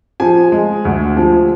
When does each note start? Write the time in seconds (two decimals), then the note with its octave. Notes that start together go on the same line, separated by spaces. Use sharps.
0.20 F3 G#5
0.52 G#3
0.85 D2
1.17 F3